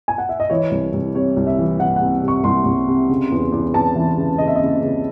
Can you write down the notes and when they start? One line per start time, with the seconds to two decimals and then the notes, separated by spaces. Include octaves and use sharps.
0.08 G#5
0.18 F#5
0.29 E5
0.40 D#5
0.50 E3 C#5
0.71 C2
0.93 C2
1.15 C3 C#5
1.36 C2
1.47 E5
1.58 E3
1.80 E3 F#5
1.96 C3 F#5
2.23 C3
2.28 C#6
2.44 C2 C6
2.66 C2
2.88 C3
3.09 C#3
3.31 E2
3.52 E2
3.74 E2 A5
3.96 E3
4.17 C#3
4.38 C#3 D#5
4.48 E5
4.55 D#5
4.61 C#3
4.82 C#3